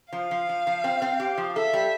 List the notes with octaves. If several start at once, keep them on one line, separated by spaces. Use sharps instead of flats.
F3 F5
F3
F3
F3
C4
C4
G4
F3
A4 E5
G3